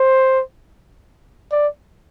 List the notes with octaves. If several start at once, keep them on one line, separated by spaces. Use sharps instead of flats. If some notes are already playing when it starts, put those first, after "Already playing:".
Already playing: C5
D5